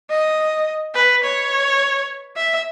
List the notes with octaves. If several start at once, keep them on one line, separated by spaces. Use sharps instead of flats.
D#5
B4
C#5
E5